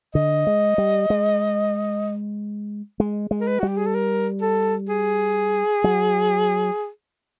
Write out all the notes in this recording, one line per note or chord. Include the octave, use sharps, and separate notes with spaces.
D3 D#5
G#3
G3
G#3
G#3
G#3
A#4
B4
G3 F#4
G4
G#4
A4
A#4
A4
G#4
F#3